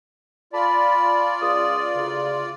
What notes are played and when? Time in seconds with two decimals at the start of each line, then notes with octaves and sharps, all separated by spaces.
0.53 F4 D5 A5 B5
1.41 C#2 D#6
1.95 D2 C#3